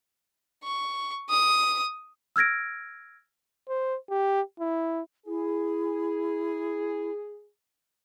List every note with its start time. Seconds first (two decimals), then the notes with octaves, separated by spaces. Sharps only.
0.64 C#6
1.30 D#6
2.36 E6 F6 G#6 A#6 D7
3.69 C5
4.10 G4
4.60 E4
5.27 E4 G#4